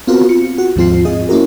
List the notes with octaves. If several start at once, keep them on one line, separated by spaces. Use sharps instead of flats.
B3 C4 F4 F#4 A#4
F4 C#7
F#4
D#2 G#2 F3 C4 F4 C7
G#2 F4 G#4 D#5 D#6
A#3 C#4 E4 F#4 A#4